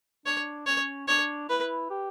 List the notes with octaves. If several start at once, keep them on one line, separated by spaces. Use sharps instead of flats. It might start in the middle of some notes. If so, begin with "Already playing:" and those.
D4 C#5
C#4 C#5
D4 C#5
E4 B4
G4